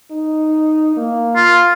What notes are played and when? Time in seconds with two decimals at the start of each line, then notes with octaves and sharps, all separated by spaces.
0.11 D#4
0.96 A#3
1.36 F4